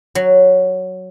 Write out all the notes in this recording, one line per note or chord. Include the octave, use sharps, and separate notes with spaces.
F#3